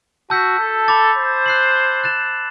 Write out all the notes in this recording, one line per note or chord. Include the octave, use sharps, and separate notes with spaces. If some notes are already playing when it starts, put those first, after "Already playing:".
F#4 A5 E6 G6 B6
A4
B5 D6 A6
C5
F#6 C7 F#7
F#6 A6 E7